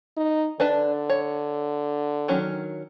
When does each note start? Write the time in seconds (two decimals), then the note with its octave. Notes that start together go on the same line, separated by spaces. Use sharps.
0.17 D#4
0.60 D3 D4 B4 A5
1.10 C#5
2.28 D#3 F#3 C#4